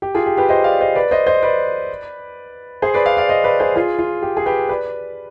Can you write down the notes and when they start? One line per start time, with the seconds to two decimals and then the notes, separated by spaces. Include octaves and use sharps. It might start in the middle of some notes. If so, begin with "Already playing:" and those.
0.02 G4
0.15 F4 G#4
0.26 G4
0.37 G4 B4
0.49 C5 D#5
0.64 D5 F5
0.81 C5 D#5
0.95 B4 D5
1.11 C5 D#5
1.27 C5 D#5
1.42 B4 D5
2.82 G#4 C5
2.94 B4 D5
3.06 D5 F5
3.17 D5 F5
3.29 C5 D#5
3.44 B4 D5
3.60 G#4 C5
3.76 F4 G#4
3.99 F4
4.23 G4
4.37 G#4
4.46 G4 B4
4.69 B4 D5